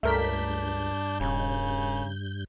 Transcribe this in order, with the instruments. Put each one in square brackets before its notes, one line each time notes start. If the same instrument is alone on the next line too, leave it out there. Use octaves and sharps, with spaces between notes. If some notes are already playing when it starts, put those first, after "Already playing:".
[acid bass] C#2 [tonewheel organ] G2 G6 [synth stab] A3 A#4 B6 [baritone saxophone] D4
[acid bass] D#1 [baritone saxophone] C#3